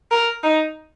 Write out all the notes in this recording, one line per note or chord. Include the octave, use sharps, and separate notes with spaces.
A#4
D#4